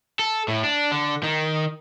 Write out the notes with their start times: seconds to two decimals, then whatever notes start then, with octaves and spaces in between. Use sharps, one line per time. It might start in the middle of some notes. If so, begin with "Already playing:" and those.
0.19 A4
0.48 A2
0.64 D4
0.92 D3
1.23 D#3